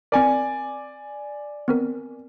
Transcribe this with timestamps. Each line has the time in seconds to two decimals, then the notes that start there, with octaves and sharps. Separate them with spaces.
0.12 C4 A#4 D5 G#5
1.68 B3 C4 A#4